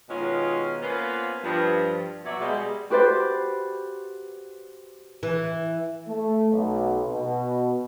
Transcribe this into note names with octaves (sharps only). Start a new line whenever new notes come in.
B2 D#3 G#3 C#4 F4
A#3 B3 C#4 F4 B4 C5
G2 F3
B2 F#3 C#5 D5 E5
B2 G3 G#3
F#4 G4 B4 C5 D5
E3
A3
B1
B2